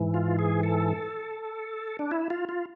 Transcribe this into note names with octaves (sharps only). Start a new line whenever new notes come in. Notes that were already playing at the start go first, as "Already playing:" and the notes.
Already playing: G#2 E3
F4
G#4
A4
D4
E4
F4
F4